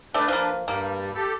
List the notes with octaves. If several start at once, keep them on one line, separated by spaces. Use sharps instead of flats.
A3 D4 B4 D5
F3 A#3
G2 G3 A#3
G4 A4